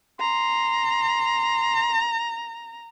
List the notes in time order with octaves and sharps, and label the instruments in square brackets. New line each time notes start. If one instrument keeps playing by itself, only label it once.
[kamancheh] A#5 [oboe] C6